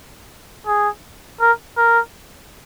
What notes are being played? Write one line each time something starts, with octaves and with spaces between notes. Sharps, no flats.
G#4
A#4
A#4